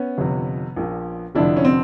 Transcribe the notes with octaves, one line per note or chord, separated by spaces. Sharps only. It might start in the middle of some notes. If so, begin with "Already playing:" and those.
Already playing: B3 C#4
G1 F2 C3
A#1 A#2 F3
F1 F2 D3 D4 E4
C#4
C4